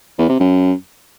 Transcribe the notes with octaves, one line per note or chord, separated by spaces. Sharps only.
E2
C3
F#2